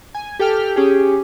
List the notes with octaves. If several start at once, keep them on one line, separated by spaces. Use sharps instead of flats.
G#5
G4 A4 G5 F6
C#4 G4 G#4